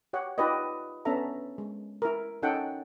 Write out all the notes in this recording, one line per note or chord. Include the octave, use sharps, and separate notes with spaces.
G4 C#5 F#5
D#4 F4 G4 B4 D5 D#5
B3 C#4 D4 A4 E5 A#5
G#3
E4 A#4
C#4 D#4 A4 F#5 G5